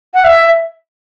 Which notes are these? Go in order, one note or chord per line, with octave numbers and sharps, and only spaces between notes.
F#5
E5